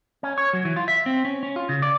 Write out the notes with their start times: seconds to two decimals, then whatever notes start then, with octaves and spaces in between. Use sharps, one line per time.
0.23 C#4
0.38 C#5
0.53 F#3
0.65 E3
0.76 F4
0.88 E5
1.06 C4
1.25 C#4
1.43 C#4
1.56 F4
1.69 C#3
1.82 D5